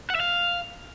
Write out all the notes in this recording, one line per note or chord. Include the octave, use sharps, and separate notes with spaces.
F#5
E5
F5